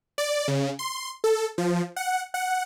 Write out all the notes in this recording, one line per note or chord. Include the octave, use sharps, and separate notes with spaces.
D5
C#3
C6
A4
F3
F#5
F#5